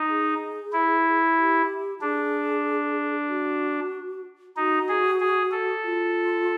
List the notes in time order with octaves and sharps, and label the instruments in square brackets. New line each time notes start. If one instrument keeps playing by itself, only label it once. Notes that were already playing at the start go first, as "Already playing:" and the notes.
Already playing: [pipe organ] D#4
[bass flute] G#4
[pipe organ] E4
[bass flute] G4
[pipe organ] D4 [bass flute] G#4
[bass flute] F#4
[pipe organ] D#4 [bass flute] F#4
[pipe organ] G#4
G#4
A4
[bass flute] F4